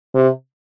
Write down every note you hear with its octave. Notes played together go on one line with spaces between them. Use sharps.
C3